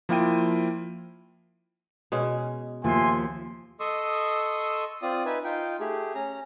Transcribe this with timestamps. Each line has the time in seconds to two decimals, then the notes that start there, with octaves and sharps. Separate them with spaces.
0.09 F3 A#3 E4 F4 G5 D#7
2.12 B2 G#3 C#4
2.84 D#2 F3 E5 G#5 C6
3.80 A4 D#5 C6 C#6 D#6 E6
5.02 C4 F4 D5 D#6
5.26 D#4 B4 E5 G#5
5.44 D#4 F4 G5
5.80 A3 G4 G#4
6.15 C#4 A#5